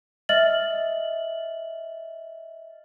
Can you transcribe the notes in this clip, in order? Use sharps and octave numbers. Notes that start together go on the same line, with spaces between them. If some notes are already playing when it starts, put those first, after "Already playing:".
D#5 E5 F6 A6 F#7